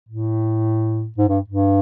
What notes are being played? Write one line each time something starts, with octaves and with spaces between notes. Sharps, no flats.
A2
G#2
G2
G2